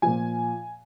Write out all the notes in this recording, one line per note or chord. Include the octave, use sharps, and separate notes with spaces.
A#2 F3 G#5